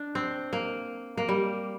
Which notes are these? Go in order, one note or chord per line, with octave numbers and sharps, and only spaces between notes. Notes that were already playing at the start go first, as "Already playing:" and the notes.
Already playing: D4
C4
A#3
A#3
G3